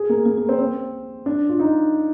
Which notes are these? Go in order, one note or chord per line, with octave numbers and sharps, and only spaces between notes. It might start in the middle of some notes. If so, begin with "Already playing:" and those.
Already playing: G#4
A#3
A#3
A#3
C4
C4
D4
F4
D#4